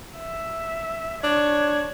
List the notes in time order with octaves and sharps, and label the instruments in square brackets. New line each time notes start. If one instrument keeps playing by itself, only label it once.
[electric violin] E5
[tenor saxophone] D4 [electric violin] C#5 G#6